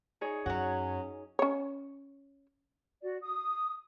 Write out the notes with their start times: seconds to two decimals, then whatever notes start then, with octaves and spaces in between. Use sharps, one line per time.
0.21 D#4 G#4 C#5
0.46 F#2 F#3 C#4 F#4
1.39 C#4 C#5
3.02 F#4 D5
3.21 D#6